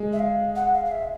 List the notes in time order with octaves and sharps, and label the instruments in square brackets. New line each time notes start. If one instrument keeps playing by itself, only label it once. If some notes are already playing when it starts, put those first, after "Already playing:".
Already playing: [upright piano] G#3
[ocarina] E5
F5
F#5
F5
F5
E5